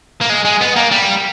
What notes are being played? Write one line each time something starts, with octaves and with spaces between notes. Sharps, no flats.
A#3
G#3
G#3
B3
A#3
G3